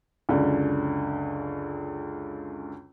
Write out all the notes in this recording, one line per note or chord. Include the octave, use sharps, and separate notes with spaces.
C#2 F#2 D3